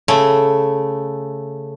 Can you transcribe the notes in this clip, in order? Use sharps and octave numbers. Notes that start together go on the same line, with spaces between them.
C#3 A3